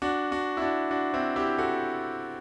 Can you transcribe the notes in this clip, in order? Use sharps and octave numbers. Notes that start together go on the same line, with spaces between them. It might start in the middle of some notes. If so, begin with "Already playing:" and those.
D4 F#4
D4 F#4
E4
D4 F#4
D4 F#4
C4 E4
E4 G4
F#4 A4